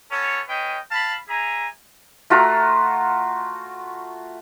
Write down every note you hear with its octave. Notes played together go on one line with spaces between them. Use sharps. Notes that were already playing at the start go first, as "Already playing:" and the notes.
B3 C#4 A4 C#5
C#4 B4 D#5 G5
F5 A5 B5
G#4 E5 G#5 A#5
A3 F4 F#4 A#5